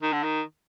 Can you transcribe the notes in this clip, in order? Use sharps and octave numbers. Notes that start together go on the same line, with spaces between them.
D#3
D3
D#3